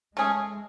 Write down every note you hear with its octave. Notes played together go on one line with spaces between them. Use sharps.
G#3 A3 C#4 G#4